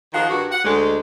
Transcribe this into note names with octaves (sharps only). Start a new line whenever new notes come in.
D#3 F3 G#4 A#4 F#5
G2 F#4
F#5
D2 G#3